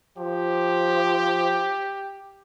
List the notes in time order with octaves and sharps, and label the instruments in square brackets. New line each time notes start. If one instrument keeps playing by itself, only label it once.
[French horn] F3 [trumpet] G4